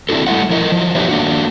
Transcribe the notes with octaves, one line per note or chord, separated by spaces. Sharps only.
C4 D4 E4 F#4 A4
G3 A3 E4 F#5
F3 E4 A#4 D#5
F3 F#3
D#4 F#4 G4 B4 C#5 E5
A#3 D4 F#4